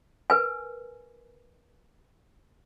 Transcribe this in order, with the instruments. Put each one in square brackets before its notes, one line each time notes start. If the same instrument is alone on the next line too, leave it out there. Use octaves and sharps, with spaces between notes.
[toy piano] A#4 B4 G#5